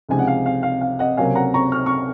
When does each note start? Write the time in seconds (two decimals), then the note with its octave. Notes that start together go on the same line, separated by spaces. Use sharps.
0.09 C#2 C3 F3 G#3 D#4 G#5
0.19 F#5
0.27 F5
0.46 F5
0.63 F5
0.81 F5
0.99 D#5 F#5
1.17 C#2 C3 F#3 A#3 F5 G#5
1.35 F#5 A#5
1.54 A#5 C#6
1.72 C#6 F6
1.86 C#6 F6